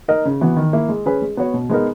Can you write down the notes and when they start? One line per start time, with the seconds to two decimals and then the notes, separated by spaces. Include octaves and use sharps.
0.08 D#4 A#4 D#5
0.25 C#3
0.41 E3 B3 F#4
0.56 D#3
0.73 A#3 E4
0.89 G#3
1.06 C#4 G#4 B4
1.22 G#3
1.37 B3 F#4 C#5
1.54 B2
1.69 G#3 B3 D#4 A#4